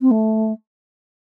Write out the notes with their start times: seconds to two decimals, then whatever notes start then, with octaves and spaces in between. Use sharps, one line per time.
0.01 C4
0.11 A3